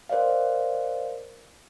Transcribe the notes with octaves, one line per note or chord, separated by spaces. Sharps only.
A#4 C5 D5 D#5 F5